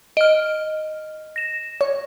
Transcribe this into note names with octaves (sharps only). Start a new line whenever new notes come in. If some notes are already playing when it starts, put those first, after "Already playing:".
D#5 F6 D7
A#6 E7
C#5